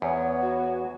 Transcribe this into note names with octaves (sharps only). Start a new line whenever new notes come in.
E2 B3 C#5
F#4